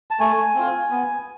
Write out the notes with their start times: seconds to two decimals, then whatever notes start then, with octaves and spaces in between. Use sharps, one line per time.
0.11 A5
0.20 A3 G#5
0.55 C4 F4
0.91 B3